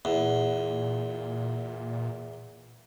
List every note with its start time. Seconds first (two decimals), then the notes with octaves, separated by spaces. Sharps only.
0.05 E2 A#2